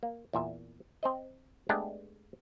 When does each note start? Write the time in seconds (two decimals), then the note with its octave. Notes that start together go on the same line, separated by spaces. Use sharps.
0.03 A#3
0.33 E2 A#2 E5
1.03 C4 C5 D#5
1.69 G#3 A3 B3 D4 G4